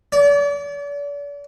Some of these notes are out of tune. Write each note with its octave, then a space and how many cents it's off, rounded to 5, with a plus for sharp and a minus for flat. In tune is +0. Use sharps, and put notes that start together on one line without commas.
D5 -40